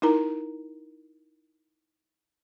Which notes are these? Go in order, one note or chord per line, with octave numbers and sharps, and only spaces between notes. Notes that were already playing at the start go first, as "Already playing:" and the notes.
D#4 E4 A#4 A#5